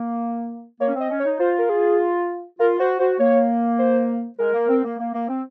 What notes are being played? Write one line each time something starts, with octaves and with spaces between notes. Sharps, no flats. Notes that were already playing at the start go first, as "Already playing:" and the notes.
Already playing: A#3
A#3 C#5
C#4
C4
D#5
C#4
C#5
D#4
F4 C5
A#4
G#4
F4 A#4
F#4 C5
F#4 C5
A#3 C#5
C5
G#3 A#4
A#3
C4
A#3
A#3
A#3
C4